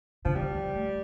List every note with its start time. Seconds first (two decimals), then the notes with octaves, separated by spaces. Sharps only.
0.25 D3 F3
0.35 D#3 G3
0.55 F3
0.75 A3